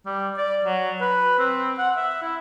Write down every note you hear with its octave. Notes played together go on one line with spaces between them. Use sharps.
G3
D5
F#3
B4
C4
F#5
E5
E4